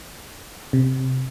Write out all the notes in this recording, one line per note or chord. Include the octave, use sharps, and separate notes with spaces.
C3